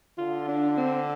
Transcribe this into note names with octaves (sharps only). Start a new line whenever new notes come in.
D3 F4
D4
C4